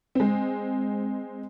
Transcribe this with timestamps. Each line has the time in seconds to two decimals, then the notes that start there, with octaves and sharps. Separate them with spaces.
0.15 G#3 C4